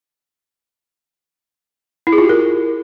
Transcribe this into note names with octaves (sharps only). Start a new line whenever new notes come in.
E4
G#4
F4
G4
A#4